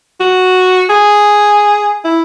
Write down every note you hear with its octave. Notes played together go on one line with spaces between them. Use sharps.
F#4
G#4
E4